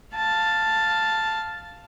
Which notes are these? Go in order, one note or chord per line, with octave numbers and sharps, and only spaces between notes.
F5 A5